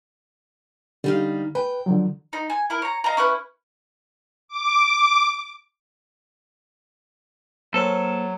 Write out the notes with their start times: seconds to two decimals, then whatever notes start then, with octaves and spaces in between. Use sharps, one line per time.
1.04 D3 G3 D#4 F5
1.55 B4 G5
1.86 D3 F3 F#3
2.33 D#4
2.50 G#5
2.70 E4 A#4
2.82 C#5 A#5
3.04 D#5 F5 A#5
3.17 C#4 E4 B4 F#6
4.48 D6
7.74 F#3 A#3 A4 C5 C#5